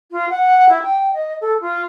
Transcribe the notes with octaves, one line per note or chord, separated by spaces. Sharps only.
F4
F#5
E4
G5
D#5
A4
F4